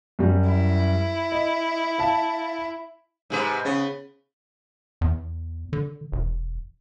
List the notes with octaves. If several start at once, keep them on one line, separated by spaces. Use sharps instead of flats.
F#2 G3
E4
D#5
F5 A5
G#2 C3 B4
C#3 B3
E2
D3
E1